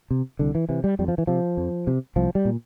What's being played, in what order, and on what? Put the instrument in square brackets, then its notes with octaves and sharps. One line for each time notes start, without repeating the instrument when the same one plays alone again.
[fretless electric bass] C3
C2 D3
E3
C3 E3
G3
F2 G3
F3
E3
C3 F3
F2
C3
C2 F3
G3
A#2